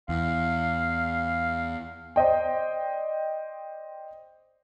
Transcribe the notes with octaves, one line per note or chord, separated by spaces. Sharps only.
E2 F5
C5 D5 D#5 G5